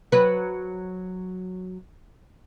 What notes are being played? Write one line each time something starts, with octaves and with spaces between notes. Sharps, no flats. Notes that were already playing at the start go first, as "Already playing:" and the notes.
F#3 B4